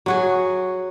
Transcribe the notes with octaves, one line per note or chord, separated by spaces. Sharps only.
F#3 F#4 G#4